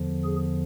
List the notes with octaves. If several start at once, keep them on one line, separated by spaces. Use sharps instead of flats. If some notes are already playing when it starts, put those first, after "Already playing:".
Already playing: E2 D3 F3
G#4